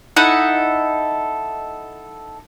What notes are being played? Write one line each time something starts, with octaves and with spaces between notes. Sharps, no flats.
D#4 E4 A4 F#5